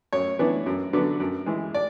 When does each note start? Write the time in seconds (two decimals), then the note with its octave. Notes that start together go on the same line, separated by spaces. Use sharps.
0.13 F#2 C#5
0.39 E3 B3 D4
0.66 F#2
0.93 D3 F#3 B3 D4
1.20 F#2
1.46 E3 G#3
1.74 D5